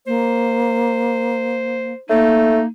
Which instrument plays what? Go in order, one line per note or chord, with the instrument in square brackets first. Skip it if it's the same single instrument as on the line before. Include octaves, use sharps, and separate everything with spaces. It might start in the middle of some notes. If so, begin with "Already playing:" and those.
[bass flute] A#3 [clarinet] C5
[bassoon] A3 [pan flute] A#3 [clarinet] D#4